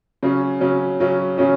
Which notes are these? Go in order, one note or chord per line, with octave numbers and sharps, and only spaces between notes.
C#3 F#3 C#4
C#3 F#3 C#4
C#3 F#3 C#4
C#3 F#3 C#4